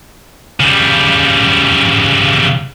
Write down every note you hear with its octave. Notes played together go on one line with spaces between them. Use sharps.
C#3 G3